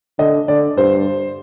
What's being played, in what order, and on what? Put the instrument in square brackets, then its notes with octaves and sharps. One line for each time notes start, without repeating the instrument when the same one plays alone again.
[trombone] D3 [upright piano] D#5
[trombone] D3 [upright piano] D5
[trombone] G2 [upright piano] C5